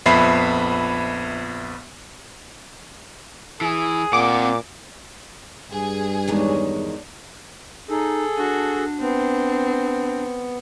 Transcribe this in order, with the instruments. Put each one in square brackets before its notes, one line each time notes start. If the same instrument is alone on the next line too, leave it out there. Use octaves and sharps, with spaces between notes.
[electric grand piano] A#1 F2 B3 E5 B5 C7
[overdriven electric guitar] E3 [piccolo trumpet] G#4
[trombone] A#2 [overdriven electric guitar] C4 F#5 [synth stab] D6
[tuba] G2 [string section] G#4
[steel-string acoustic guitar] E2 D#3 G#3 [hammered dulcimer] D4 C#5
[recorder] D#4 [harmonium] G#4 A4
[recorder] D4 [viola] F#4
[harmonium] B3 [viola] C4